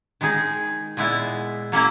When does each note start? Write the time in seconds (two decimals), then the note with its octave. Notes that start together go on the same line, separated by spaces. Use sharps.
0.21 D#3 G#3 D#4 G#4
0.97 A#2 G#3 B3 E4
1.72 F#3 A#3 C#4 E4